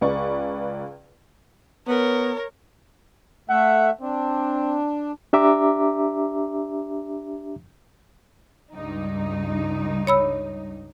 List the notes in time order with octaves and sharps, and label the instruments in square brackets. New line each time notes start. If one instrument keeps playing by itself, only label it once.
[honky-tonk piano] C#2 G#4 B4 D5 C#6
[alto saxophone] B3 [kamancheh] A#4 C#5
[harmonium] A3 E5 [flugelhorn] F#5
[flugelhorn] C4 [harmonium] D4
[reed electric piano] D4 G4 E5 A#5 D6
[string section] C#2 G2 D#4
[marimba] C#5 B5 E6